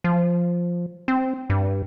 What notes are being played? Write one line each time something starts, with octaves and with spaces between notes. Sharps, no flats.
F3
C4
G2